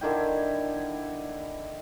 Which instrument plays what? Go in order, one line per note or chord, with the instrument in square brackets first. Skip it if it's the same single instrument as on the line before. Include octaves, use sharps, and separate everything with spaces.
[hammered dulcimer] D3 D#3 E4 G5